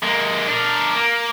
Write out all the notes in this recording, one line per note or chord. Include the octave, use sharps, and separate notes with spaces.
G#3 A#3
D4 A#4
A#3